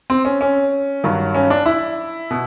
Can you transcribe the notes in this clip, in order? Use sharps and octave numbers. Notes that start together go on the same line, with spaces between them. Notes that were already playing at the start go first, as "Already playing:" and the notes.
C4
C#4
C#4
G2 D#3 F#3
C#4
D4
E4
B2